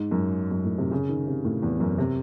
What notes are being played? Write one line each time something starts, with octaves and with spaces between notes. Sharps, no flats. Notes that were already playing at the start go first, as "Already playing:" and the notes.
Already playing: G#2
F#2
F#2
A2
C3
C#3
D#3
C3
A2
E2
F#2
C3